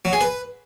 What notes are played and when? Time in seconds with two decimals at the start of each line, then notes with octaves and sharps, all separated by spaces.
0.05 F#3
0.13 G#4
0.21 B4